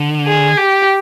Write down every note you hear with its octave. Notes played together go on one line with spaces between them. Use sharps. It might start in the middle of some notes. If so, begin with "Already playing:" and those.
Already playing: D3
G#4
G4